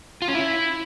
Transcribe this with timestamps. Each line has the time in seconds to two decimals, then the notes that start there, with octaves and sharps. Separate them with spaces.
0.22 F4
0.28 C#4
0.34 E4